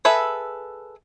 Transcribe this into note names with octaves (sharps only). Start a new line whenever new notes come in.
G#4 A4 B4 E5